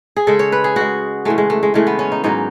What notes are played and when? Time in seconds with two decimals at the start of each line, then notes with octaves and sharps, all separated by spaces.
0.16 G#4
0.27 C#3 G#3 A4
0.39 C#5
0.52 B4
0.64 G#4
0.76 C#3 G#3 F#4
1.25 C#3 E3 G#3 A3
1.38 G#3
1.50 A3
1.63 G#3
1.74 C#3 E3 G#3 A3
1.87 B3
1.99 C#4
2.12 D#4
2.24 G#2 D#3 F#3 D#4